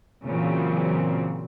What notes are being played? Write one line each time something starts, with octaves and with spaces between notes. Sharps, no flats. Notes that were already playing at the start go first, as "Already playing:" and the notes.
A#2 C#3 E3 F#3 C4